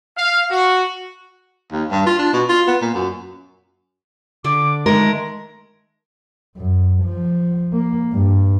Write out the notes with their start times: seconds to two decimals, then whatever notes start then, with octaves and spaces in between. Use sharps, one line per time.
0.17 F5
0.51 F#4
1.72 D#2
1.91 G2
2.07 F4
2.19 D4
2.33 B2
2.49 F4
2.68 B3
2.82 A#2
2.95 F#2
4.44 D3 D4 D5 D6
4.86 D#3 G#3 A3 A#4
6.57 F#2
7.04 F3
7.73 A#3
8.13 G2